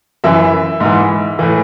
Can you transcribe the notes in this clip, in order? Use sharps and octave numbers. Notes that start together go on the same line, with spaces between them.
F#2 E3 E5
G#2
E3
A2 E3